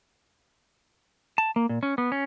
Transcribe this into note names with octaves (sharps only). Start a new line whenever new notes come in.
A5
A#3
A#2
C#4
B3
C#4